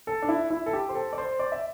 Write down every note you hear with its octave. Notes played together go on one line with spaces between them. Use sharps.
A4
D4
E4
E4
A4
G4
C5
A4
D5
C5
D5
E5